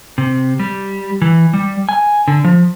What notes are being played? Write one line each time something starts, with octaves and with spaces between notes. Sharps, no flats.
C3
G3
E3
G3
G#5
D3
F3